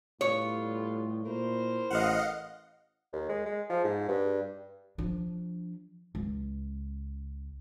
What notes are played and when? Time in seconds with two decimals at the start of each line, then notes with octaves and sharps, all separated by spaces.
0.21 A2 G3 B3 F4 C#5
1.25 A#2 E4 A#4 C5
1.90 A1 D#5 F5 F#5
3.13 D#2
3.29 G#3
3.45 G#3
3.70 F3
3.84 G#2
4.09 G2
4.98 F3 D4
6.15 C#2